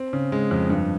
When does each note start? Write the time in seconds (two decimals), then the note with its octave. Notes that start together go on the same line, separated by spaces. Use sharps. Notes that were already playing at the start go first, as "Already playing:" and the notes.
Already playing: C4
0.13 C#3
0.32 G#3
0.51 F2
0.70 G2